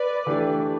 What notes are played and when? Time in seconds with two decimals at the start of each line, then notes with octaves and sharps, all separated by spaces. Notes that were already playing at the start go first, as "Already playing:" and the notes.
Already playing: B4 D5
0.26 E3 A3 D4 G4